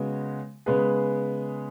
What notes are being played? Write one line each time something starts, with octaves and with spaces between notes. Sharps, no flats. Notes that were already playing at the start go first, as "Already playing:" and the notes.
Already playing: C#3 G#3 B3 F#4
C#3 G#3 B3 G#4 B4